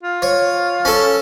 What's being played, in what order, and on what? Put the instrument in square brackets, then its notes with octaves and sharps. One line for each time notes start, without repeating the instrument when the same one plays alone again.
[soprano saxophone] F4
[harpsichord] C#5
C#4 A4